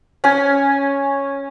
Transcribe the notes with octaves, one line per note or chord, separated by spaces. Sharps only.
C#4 G#5